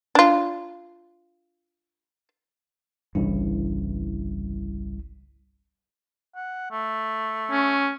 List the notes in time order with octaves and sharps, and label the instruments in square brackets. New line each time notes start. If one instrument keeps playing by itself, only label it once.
[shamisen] D4 F4
[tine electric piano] G1 C2 E4 [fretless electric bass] G2 C#3 E3
[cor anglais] F#5
A3
[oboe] C#4